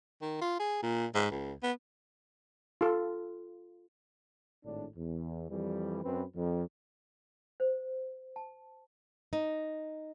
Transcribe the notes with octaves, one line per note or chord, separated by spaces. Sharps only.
D#3
F4
G#4
A#2
G#2
C#2
B3
F4 A4
G#1 A2 D4
E2
F2 E3 G3
F#2 C4 B4
F2
C5
A5
D#4